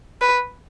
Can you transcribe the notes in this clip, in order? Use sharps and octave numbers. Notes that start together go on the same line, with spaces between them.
B4